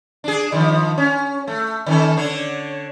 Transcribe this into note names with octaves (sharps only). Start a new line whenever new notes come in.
D4 G#4
D#3 F3
C#4
A3
D#3 C#4 A4
D3 D4 C#5